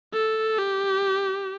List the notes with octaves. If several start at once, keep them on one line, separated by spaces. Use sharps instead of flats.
A4
G4